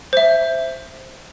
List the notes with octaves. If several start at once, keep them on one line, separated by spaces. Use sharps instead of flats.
C5 E5